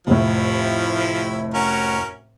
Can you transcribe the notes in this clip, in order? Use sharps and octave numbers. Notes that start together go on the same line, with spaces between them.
F1 A2 F3 E4
C#4 F#4 A#4